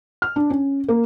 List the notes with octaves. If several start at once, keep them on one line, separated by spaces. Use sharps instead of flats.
F6
D4
C#4
A#3